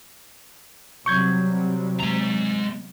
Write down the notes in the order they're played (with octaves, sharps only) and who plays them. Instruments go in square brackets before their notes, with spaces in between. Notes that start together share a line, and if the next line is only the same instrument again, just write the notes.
[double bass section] C3 F#3 G3 [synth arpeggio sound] C#6 G6 G#6
[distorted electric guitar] G#3 A#5